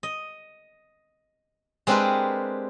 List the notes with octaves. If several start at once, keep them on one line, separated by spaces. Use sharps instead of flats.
D#5
G#3 C4 D4 G4 A#4 B4